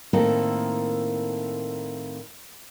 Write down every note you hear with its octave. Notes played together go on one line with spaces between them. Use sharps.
A2 D#3 A3 A#3 C4 E4